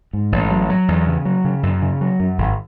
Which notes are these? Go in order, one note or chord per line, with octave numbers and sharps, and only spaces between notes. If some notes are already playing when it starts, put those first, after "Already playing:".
G#2
A1
F#3
F#3
E2
C#3
F#3
C#3
F#2
C#3
F#3
F#2
G#1